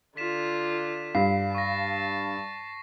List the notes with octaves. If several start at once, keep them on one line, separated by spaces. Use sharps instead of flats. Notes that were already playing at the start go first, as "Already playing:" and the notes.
D3 F4 B6 E7
G2 F5 C7
A5 C#6 A#6